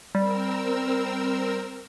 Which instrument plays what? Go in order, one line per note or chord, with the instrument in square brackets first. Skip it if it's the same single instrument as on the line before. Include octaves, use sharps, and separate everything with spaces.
[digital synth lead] G3 [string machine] C4 A#4 E6